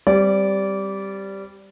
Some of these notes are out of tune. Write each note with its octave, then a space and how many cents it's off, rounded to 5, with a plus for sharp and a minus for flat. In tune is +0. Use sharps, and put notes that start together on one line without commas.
G3 +0 C4 +0 D5 -20